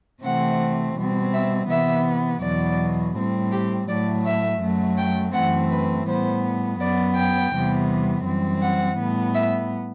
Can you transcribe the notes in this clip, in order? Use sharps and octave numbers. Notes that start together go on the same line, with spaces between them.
C3 E3 A3 C4 F#5
B2 G3 C4
E5
C3 E3 B3 E5
E2 B2 F#3 D5
A2 G3 C4
G4
A2 F#3 A3 D5
E5
F#2 F#3 A3
G5
F#2 E3 A3 C4 F#5
B4
A2 G3 B3 C5
F#2 F#3 B3 D5
G5
E2 C3 G3 B3
F#2 E3 G3 C4
F#5
A2 G3 B3
E5